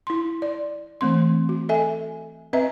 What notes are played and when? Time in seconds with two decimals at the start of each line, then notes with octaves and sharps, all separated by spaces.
0.07 E4 C6
0.42 D5
1.01 E3 A3 C4 C6
1.49 F#4
1.69 A4 D#5 E5 G#5
2.53 C4 B4 D#5 E5 A#5